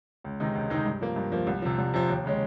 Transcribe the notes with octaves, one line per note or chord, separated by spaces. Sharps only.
C#2
C3 D#3 G#3 D#4
C#2
C3 D#3 G#3 D#4
G2
F3 A#3
G2
F3 A#3
C2
C3 F3
C2
C3 F3
D#2
C#3 G#3 C#4